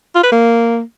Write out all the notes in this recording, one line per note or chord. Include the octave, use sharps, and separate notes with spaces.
F4
B4
A#3